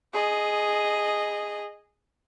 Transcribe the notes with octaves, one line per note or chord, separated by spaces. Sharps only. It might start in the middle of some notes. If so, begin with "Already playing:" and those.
G#4 D#5